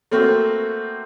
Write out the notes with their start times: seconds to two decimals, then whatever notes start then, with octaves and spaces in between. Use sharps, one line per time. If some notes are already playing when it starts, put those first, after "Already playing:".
0.11 A3 A#3 C4 F#4